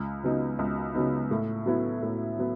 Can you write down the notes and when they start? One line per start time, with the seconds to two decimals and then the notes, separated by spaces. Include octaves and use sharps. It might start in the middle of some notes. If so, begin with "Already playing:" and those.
Already playing: C#2
0.24 C#3 F#3 B3 D#4
0.59 C#2
0.95 C#3 F#3 B3 D#4
1.31 A2
1.66 F#3 B3 E4
2.03 A2
2.39 F#3 B3